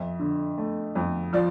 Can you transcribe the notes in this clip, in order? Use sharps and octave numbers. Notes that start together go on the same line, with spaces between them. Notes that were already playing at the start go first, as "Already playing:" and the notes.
Already playing: F2 E5
D3
A3
F2
F3 D5